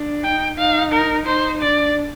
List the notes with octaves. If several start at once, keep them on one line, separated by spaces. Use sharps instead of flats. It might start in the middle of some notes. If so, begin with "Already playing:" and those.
Already playing: D4
D#4 G5
D#4 F5
A#4
D#4 C5
D4 D5